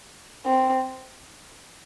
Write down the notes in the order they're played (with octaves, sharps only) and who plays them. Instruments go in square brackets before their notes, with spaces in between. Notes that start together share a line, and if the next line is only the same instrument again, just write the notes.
[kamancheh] C4